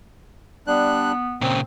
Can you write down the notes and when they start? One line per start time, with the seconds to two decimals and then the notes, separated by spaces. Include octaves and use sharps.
0.67 G3 B3 D4 F#6
1.41 A#2 C#3 C4